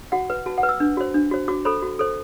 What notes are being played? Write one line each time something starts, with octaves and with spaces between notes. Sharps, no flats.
F#4 F#5
B4
F#4 A5
F#5
B4
E6
D4
F#4 C5
D4
F#4 C5
F#4 D6
A4 C5 B5
F#4
A4 C5